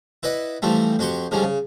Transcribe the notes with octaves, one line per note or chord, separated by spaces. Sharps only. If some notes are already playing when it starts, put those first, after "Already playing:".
E4 B4 D5 D#5 F#5
E3 F3 G3 A3 C4
F2 F#4 G4 C6 C#6
G#2 D3 F3 G3 C#4
C#3